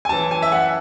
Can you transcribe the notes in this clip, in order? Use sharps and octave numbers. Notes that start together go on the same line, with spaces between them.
G#5
F#2 E3 A5
G#5
E5
F#5